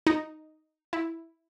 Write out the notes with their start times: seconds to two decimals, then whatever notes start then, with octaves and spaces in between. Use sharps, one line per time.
0.07 D#4
0.93 E4